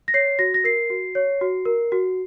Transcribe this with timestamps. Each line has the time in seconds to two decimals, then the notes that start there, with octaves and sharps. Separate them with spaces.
0.08 A#6
0.14 C#5 C7
0.39 F#4 A#6
0.54 A#6
0.64 A#4 C7
0.90 F#4
1.15 C#5
1.41 F#4
1.65 A#4
1.92 F#4